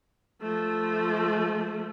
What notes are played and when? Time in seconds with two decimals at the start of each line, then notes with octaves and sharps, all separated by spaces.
0.41 F3 A3